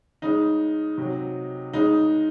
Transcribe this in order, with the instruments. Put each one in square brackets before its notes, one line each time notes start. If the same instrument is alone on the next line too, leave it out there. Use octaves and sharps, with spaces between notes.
[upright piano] C#3 G#3 D#4
C3 F#3
C#3 G#3 D#4